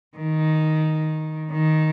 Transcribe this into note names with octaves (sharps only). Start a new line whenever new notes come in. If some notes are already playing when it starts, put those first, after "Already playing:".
D#3
D#3